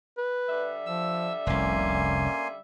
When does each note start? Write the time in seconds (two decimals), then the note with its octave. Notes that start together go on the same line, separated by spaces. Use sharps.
0.17 B4
0.49 D3 G3 E5
0.86 F3 E6
1.47 F1 C2 A#3 C#4 G#5 C6